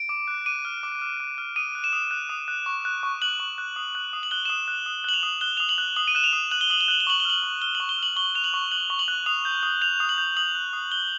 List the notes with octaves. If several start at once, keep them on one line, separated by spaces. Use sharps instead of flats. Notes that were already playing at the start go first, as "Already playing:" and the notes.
Already playing: D7
D6
F#6
D6 D#7
F6
D6
F6
D6
F6
D#6 D#7
F#6
E7
D#6
F#6
D#6
F#6
C#6
F#6
C#6
F#6 F#7
C#6
F#6
D#6
F#6
D#6
F#7
F#6 G7
D#6 E7
F#6
D#6
F#6 F#7
F7
D#6
F#6 G7
D#6 F7
F#7
F#6
D#6 F#7
D#7
F#6 E7
F7
D#6
F#6 F#7
G7
D#6 F#7
G7
F#6 F#7
G7
C#6 F#7
G7
F6 F#7
C#6
F6 G7
F#7
C#6
G7
F6 F#7
C#6 G7
F#6 F7
F#7
C#6
F#6 F#7
C#6
F#7
F#6
D#6 F7
G6
D#6
G6 F7
D#6
F#7
G6
D#6 F#7
F#6
D#6
F#6 G7